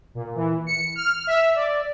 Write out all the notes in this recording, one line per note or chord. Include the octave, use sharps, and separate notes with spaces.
A#2
E3
C#7
F6
E5
D5